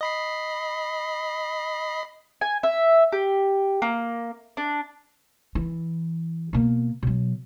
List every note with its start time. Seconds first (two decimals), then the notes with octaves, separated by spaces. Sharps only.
0.01 D#5 B5 C7
2.41 G#5
2.63 E5
3.12 G4
3.82 A#3
4.57 D4
5.55 E3
6.53 B2 A#3
7.03 B2 F#3